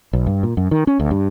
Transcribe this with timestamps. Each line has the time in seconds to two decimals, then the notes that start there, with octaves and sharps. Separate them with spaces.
0.13 B1
0.27 G2
0.43 A#2
0.57 F#2
0.71 D#3
0.87 C#4
1.00 D2
1.11 G2